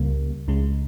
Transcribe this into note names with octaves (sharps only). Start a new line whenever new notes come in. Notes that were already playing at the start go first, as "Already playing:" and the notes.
Already playing: C#2 C#3 G3 A#3
C#2 C#3 G#3